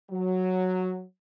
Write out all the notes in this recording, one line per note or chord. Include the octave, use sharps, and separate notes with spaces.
F#3